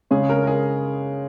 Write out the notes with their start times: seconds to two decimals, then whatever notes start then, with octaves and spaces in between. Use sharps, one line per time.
0.11 C#3 G#3 C#4 G#4
0.29 A#4
0.43 A#4
0.47 G#4